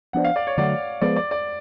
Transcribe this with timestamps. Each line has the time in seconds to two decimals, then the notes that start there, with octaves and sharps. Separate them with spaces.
0.13 F3 B3 D4 F#5
0.24 F5
0.36 D5
0.47 C#5
0.57 D3 F#3 A3 D5
1.02 F3 G#3 B3 D5
1.16 D5
1.31 D5